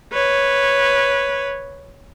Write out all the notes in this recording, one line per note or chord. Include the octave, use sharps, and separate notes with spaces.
B4 C#5